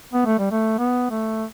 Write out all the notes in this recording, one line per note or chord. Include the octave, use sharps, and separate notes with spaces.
B3
A3
G3
A3
B3
A3